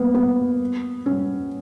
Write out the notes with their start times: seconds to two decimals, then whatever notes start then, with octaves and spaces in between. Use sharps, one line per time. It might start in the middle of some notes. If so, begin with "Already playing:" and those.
Already playing: A#3 B3
0.14 B3
1.06 C#4